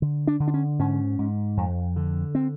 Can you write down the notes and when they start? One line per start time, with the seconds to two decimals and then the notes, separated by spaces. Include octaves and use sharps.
0.02 D3
0.27 D4
0.40 D3
0.48 D4
0.54 C#4
0.79 G#2 C#4
1.19 G#2
1.57 F2
1.96 D3
2.35 C4